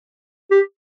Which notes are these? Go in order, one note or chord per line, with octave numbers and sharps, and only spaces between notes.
G4